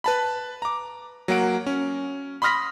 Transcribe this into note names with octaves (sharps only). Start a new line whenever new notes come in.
B4 A5 B5
A#5 D6
F#3 A#3 F#5 D7
C#4
B5 C6 D#6 F6 A#6 B6